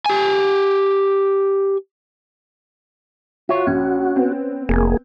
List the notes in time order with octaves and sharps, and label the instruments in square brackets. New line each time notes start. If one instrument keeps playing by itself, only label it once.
[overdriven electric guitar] G4 G#5
[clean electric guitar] F4 C#5 [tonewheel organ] F#4 [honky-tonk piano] E5
[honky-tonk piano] A#1 [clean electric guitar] C#4
[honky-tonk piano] B3 C4
[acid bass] F1 [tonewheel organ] A#3 G#4